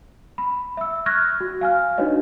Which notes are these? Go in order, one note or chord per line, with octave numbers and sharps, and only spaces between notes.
B5
E5 E6
C#6 F6 F#6 G#6 A#6
F#4
F5 G#5 F6
D4 D#4 F#4 B4 C#5 D#5